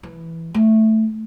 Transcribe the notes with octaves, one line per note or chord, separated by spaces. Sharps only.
E3
A3